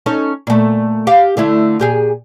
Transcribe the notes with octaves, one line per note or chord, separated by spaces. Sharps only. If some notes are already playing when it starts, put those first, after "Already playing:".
C#4 D#4 A4
A#2 A3
G4 F5
D3 A3 E4
A#2 G4 G#4